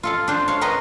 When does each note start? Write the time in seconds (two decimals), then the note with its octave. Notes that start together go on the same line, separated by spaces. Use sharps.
0.03 F4 A4 F5
0.28 D4 C5
0.48 C#5 F5
0.61 A#4 B4 C#5 D#5 A#5 C6